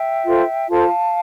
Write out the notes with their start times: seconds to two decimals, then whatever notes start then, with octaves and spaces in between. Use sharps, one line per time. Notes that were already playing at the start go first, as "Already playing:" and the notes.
Already playing: E5 G5
0.26 F4 A4 C5
0.69 F4 A4 C5 F5 A5